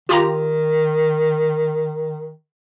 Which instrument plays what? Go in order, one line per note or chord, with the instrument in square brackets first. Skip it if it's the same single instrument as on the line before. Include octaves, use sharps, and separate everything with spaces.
[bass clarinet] D#3 [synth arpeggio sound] F4 G4 A#5